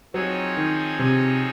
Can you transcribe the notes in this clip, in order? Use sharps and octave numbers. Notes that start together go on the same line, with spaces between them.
F3 F#3 C4 D#4 G#4 C#5
D#3
C3